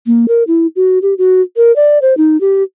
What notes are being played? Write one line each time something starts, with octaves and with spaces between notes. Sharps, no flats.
A#3
A#4
E4
F#4
G4
F#4
A#4
D5
C5
D#4
G4